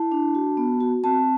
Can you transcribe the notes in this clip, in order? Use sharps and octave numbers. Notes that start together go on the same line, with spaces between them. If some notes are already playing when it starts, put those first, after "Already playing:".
Already playing: E4 A5
D4
F#4
B3
F#4
C4 A5